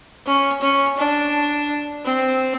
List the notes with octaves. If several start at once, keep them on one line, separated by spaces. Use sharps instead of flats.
C#4
C#4
D4
C4